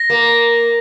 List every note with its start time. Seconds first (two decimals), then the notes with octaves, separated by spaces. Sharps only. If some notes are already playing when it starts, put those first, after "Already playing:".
Already playing: A#6
0.10 A#3